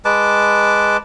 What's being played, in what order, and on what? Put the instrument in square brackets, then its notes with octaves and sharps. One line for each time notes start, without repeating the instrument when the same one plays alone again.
[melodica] G#3 B4 A5 D6